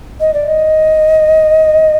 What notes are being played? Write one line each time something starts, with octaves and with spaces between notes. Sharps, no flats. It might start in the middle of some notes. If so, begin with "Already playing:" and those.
D#5
D5
D#5